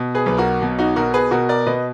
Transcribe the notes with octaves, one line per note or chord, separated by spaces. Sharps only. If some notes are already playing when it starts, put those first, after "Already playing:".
Already playing: B2
G#4 B4
B1 B4
F#4 A#4
B2
D#4 F#4
B2 F#4 A#4
G#4 B4
B2 F#4 A#4
A#4 D5
B2 B4 D#5